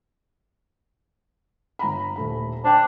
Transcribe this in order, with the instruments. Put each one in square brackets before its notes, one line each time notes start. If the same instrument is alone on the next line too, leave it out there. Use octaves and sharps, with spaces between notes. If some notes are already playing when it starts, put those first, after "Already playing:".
[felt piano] G1 A#5 B5
D#1 A3 B5
[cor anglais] D4 [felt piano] C5 G5